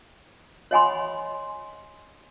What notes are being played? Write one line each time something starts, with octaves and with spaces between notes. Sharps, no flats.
C#5 D#5 F#5 G#5 B5 C6